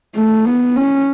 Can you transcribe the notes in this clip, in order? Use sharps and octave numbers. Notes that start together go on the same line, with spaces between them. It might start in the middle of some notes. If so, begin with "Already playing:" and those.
A3
B3
C#4